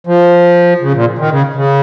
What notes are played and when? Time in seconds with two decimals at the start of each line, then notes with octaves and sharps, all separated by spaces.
0.07 F3
0.81 C#3
0.94 A#2
1.19 D#3
1.31 C#3
1.55 C#3